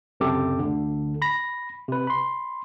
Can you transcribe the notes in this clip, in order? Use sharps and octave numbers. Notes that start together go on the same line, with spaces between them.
C#2 F#2 C3 G4 A4 D6
D2 D3
B5 A#6
C3 B4
B5 C6